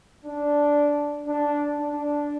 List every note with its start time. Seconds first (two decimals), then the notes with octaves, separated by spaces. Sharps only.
0.25 D4
1.27 D4
1.79 D4